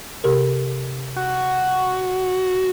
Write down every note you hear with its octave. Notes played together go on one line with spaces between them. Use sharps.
C3 G4 A#4
F#4